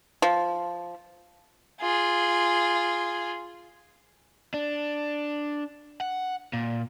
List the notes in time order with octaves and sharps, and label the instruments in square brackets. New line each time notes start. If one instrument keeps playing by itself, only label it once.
[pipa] F3
[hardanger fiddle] F4 G#4
[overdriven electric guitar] D4
F#5
A#2